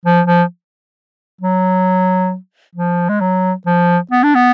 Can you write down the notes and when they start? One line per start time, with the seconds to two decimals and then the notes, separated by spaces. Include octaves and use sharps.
0.05 F3
0.27 F3
1.41 F#3
2.76 F3
3.09 G#3
3.21 F#3
3.66 F3
4.11 B3
4.23 D4
4.35 B3